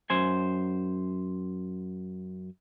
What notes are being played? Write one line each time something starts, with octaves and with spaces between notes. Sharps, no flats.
F#2 C5 G#5